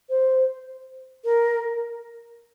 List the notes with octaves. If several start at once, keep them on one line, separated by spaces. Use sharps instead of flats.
C5
A#4